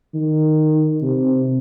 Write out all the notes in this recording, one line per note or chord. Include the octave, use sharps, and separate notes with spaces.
D#3
C3